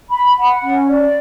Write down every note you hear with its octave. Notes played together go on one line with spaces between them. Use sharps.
B5
F#5
C#4
D5